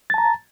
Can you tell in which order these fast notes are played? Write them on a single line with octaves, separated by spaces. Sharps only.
A6 A5 A#5